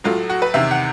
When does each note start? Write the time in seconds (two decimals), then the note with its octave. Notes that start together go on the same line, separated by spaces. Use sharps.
0.04 A2 F#3 A3 F4
0.30 F#4
0.42 B4
0.54 E2 C3 D#3 E5
0.71 F#5